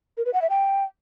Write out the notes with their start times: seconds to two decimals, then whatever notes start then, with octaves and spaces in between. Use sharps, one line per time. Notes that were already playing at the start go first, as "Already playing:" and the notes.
0.17 A#4
0.26 B4
0.34 F#5
0.42 E5
0.50 G5